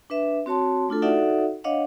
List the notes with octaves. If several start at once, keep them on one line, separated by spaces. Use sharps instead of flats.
D4 B4 E5
C4 F#4 C#5 A5 C6
A3 D4 F4 A4
D#4 F#4 A4 D5 E5 F#5
D4 C#5 D#5 F5 F#5